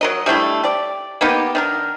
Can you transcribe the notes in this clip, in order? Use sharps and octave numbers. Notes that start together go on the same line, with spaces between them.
F#3 A#4 D#5
G3 A3 D4 E4
G4 D5
A#3 B3 D#4 G4
D#3 D4 A#4